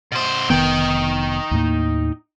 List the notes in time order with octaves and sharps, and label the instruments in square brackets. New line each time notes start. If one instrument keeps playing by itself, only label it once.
[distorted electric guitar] B2 C5
[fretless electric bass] F1 D#3 B3 [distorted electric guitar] D#4 G5
[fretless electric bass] D#2 A2 A#3